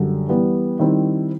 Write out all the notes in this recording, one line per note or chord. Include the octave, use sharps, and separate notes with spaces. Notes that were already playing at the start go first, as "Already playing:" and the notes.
Already playing: F#2 D3 G3
E3 G3 B3
D#3 G3 C4 E4